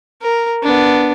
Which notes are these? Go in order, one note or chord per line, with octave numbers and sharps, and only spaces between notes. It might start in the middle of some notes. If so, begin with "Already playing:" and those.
A#4
B3 D4